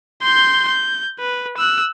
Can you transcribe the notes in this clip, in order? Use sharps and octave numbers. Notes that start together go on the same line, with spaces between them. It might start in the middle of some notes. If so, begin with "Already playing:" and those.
C6 G6
G6
B4
E6 F#6